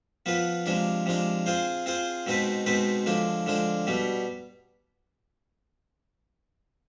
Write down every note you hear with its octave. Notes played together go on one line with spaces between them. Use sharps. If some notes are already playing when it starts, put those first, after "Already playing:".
F3 B3 F4 B4
C3 F3 G#3 D4
C3 F3 G#3 D4
C4 F4 G#4 C5
C4 F4 G#4 C5
B2 G#3 C4 D#4 B4
B2 G#3 C4 D#4 B4
D3 F3 G#3 D4
D3 F3 G#3 D4
B2 G3 B3